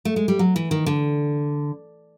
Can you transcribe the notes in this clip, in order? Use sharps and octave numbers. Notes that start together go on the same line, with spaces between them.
A3
G#3
G3
F#3
E3
D#3
D3